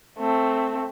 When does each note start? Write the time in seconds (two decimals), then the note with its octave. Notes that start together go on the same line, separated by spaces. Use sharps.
0.18 A3 C4